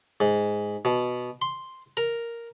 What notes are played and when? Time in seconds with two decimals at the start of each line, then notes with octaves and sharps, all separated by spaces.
0.20 G#2
0.85 B2
1.42 C6
1.97 A#4